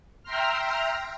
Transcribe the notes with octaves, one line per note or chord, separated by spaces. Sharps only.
E5 G5 A#5 C6 F6